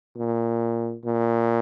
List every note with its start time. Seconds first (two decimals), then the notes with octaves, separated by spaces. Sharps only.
0.17 A#2
1.05 A#2